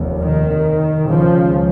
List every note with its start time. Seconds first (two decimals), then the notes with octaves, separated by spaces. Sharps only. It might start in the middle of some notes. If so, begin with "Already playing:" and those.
Already playing: F1 D#2
0.18 D#3
1.08 C#2 C#3 F3